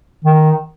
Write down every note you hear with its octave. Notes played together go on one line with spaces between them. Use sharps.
D#3